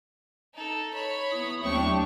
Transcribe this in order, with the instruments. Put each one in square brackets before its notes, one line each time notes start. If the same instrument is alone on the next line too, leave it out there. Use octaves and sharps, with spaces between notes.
[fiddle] D#4 A4
C#5 B5
[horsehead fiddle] B3 E4 [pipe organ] D#6
[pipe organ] D#2 F#3 A3 [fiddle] C4 C#6 [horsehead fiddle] D4 G4